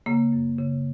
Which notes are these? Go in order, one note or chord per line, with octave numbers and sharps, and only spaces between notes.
C#3 A#3
F#2
C#3